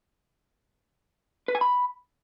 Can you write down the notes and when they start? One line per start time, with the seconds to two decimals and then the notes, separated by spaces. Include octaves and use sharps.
1.48 B4
1.55 G#5
1.61 B5